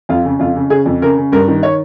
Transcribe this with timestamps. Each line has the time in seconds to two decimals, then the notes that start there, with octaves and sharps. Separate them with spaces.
0.09 F2 F4
0.25 C#3
0.39 F2 F4
0.56 C#3
0.70 C#3 G#4
0.86 F2
1.02 C#3 A#4
1.17 C#3
1.32 G2 A#4
1.48 D#3
1.63 C#5